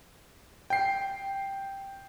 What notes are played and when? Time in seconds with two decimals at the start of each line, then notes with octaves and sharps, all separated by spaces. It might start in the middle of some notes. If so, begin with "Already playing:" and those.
0.70 G5 C7